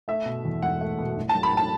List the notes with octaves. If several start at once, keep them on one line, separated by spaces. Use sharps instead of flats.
A3 E5
B2
E2
E1 F#5
A3
B2
A1
A5
F#3
B5
A2 A5